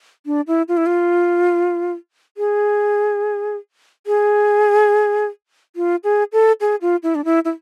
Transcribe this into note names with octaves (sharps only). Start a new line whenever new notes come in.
D4
E4
F4
E4
F4
G#4
G#4
F4
G#4
A4
G#4
F4
E4
D4
E4
E4